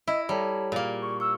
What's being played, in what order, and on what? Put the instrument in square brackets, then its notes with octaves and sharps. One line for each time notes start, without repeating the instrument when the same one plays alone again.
[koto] E4 [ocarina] D#5 [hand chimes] E5
[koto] G3 [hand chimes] A4 A5 A#5 [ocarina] C#5
[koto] A#2 A#3 [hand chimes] G#4
[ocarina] C#6
[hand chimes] C#6 F6 [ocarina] E6